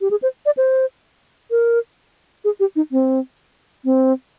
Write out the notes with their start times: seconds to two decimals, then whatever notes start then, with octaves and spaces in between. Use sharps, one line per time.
0.01 G4
0.11 G#4
0.22 C5
0.46 D5
0.57 C5
1.51 A#4
2.45 G#4
2.60 G4
2.76 D#4
2.92 C4
3.85 C4